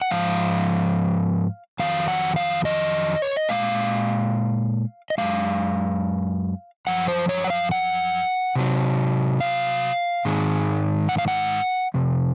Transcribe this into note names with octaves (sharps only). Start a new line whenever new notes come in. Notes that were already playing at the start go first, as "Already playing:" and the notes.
F#5
G#2 F3 F5
F2 D#3 F#3 F5
F#5
F5
D#5
C#5
D#5
A#2 G#3 F5
D#5
F#2 F3 G#3 F5
F#2 F3 F#5
C5
C#5
F#5
F5
F#5
C3 F#3
F5
G#2 D#3 G#3
F#5
F5
F#5
F2 C3